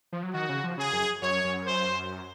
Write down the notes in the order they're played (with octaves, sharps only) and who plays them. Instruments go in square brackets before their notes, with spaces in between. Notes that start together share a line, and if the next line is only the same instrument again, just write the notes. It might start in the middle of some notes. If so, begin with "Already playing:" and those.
[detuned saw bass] F3
F#3
[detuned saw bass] D#3 [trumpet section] F#4
[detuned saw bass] C#3
F3
[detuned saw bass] C#3 [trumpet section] G#4
[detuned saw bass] F#2
[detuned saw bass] F#2 [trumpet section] C#5
[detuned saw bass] F#2
[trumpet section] C5